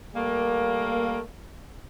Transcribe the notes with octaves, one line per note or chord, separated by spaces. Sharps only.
G3 A3 A#3